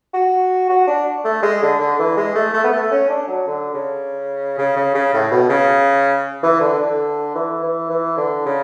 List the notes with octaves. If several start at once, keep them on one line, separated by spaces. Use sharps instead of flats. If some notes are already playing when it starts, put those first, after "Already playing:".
F#4
F#4
D4
A3
G#3
D3
D3
E3
G#3
A3
A3
B3
A3
C#4
D4
F#3
D3
C#3
C#3
C#3
C#3
A2
B2
C#3
E3
D3
D3
E3
E3
E3
D3
C#3